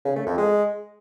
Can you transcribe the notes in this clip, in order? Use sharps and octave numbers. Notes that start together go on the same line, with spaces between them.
C#3
A3
F2
G#3